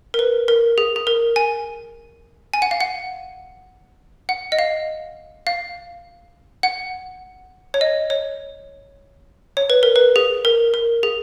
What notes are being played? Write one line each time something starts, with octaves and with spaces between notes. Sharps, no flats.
A#4
B4
A#4
G#4
G#4
A#4
G#5
G#5
F#5
F5
F#5
F#5
D#5
F5
F5
F#5
C#5
D#5
C#5
C#5
B4
A#4
B4
G#4
A#4
A#4
G#4